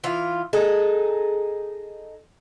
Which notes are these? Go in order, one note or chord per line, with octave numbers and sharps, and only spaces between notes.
E3 F4
D#4 G#4 A4